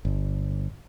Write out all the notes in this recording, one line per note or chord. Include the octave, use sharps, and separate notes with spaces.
G1